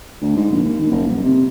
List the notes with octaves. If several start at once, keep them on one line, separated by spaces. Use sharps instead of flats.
D2
G#2
A#1
D#2
D#2
F#1
D#1
C3